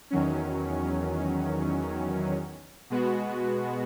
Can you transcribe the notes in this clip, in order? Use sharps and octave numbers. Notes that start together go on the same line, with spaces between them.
E2 D#3 F#3 C#4
B2 G#3 B3 F#4